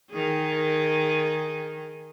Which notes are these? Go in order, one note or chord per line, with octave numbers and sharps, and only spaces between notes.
D#3 G#4